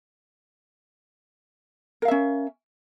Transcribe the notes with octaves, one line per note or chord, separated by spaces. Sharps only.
C#4 A#4 E5 F5